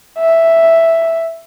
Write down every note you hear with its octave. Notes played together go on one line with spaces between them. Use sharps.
E5